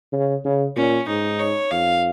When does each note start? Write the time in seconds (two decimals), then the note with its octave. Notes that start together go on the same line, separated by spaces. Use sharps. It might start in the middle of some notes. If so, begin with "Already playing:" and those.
0.13 C#3
0.45 C#3
0.76 A#2 C#4
1.08 G#2 D#4
1.39 C#5
1.71 F2 F5